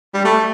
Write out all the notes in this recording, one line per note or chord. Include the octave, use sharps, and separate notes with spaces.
G3
A3